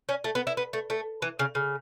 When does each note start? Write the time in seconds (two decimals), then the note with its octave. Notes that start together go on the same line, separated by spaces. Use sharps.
0.09 C#4
0.24 A3
0.35 B3
0.47 E4
0.57 B3
0.73 A3
0.90 A3
1.22 E3
1.39 C#3
1.55 C#3